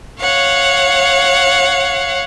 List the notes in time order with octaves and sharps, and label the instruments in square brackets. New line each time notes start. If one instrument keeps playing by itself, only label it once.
[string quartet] C#5 F5 F#5